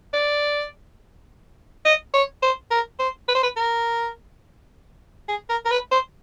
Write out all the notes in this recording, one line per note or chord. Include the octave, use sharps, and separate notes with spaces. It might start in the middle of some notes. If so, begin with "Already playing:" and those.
D5
D#5
C#5
C5
A#4
C5
B4
C5
B4
A#4
G#4
A#4
A#4
B4
C5